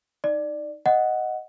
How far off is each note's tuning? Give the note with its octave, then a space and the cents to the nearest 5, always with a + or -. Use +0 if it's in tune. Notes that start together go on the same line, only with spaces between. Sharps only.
D#4 +0 D5 +10
D#5 +0 F#5 +0